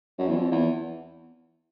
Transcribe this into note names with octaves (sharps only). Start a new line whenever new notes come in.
F#2
E2
F2
E2